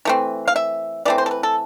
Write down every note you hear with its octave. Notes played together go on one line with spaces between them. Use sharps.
E3 A3 C4
F5
E5
E3 A3 C4 D5
C5
A4
B4
A4